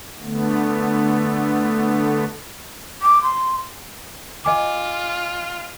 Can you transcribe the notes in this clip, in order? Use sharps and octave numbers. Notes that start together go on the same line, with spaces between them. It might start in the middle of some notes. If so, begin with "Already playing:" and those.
D3 A3 B3
D6
C6
F4 D#5 G#5 D6